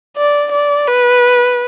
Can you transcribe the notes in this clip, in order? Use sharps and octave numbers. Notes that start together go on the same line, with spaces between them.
D5
D5
B4